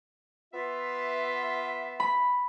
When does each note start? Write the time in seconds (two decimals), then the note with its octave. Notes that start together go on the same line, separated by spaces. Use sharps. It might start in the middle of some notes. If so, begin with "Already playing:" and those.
0.52 B3 F4 E5
2.00 B5